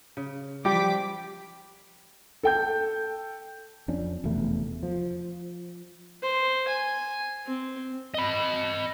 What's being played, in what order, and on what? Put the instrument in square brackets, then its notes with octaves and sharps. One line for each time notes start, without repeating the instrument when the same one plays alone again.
[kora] C#3
[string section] F3 D6 B6 [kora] G3 [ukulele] G4
[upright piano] A4 G5 G6
[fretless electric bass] F2 C#4 D4
F1 E2 B2 A3
F3
[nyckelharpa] C5
G#5
C4
[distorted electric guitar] D#5 B5